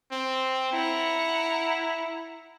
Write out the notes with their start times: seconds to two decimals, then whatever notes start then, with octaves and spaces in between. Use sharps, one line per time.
0.12 C4
0.73 E4 F#5 A#5